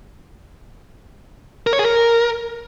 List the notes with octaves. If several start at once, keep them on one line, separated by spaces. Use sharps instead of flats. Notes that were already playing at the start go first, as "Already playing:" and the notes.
A#4
C#5
G#4
A#4